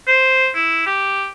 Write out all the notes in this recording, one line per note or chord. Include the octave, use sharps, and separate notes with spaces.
C5
E4
G4